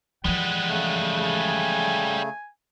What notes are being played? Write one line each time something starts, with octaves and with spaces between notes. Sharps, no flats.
E3 F3 G3 G#3 F#5
C#3 A3
G#5